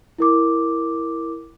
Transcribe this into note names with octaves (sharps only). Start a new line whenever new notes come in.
E4 A#4 D6